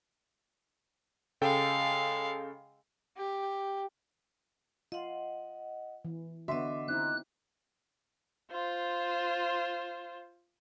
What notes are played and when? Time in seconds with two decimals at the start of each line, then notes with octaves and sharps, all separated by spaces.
1.41 C#3 G#3 A4 F5 G5
3.17 G4
4.92 F4 D#5 F#5
6.05 E3
6.48 D3 B3 F#4 D#5 E5 C6 D6
6.88 C4 D#4 E4 F#6
8.51 F4 C5